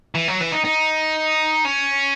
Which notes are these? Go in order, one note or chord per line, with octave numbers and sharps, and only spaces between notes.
E3
F#3
E3
D#4
D#4
C#4